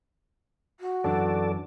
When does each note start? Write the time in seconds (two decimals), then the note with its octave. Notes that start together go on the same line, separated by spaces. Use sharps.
0.80 F#4
1.04 F#2 E3 D4 A4 D5